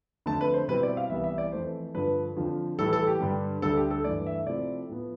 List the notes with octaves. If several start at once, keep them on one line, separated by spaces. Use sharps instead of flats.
F2 D3 A3 A5
B4
C5
B2 G3 C4 E4 B4
D5
F5
C2 C3 E3 G3 B3 E5
E5
D5
F2 E3 A3 C5
G2 D3 F3 B4
F2 D3 F3
A2 E3 G3 A4
A4
G4
G2 D3 G3
D2 D3 G3 A4
G4
A4
G2 E3 A3 D5
E5
C3 F3 A3 C4 E4 D5
A2 F3 B3